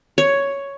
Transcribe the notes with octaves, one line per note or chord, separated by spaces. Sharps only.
C#5